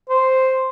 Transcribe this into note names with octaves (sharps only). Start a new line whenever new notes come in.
C5